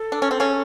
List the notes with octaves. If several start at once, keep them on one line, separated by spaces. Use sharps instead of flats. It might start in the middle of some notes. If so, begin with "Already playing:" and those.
Already playing: A4
D4
C#4
C4
C#3 C#4